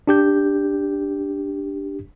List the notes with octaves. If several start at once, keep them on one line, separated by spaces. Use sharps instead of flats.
D4 G4 G6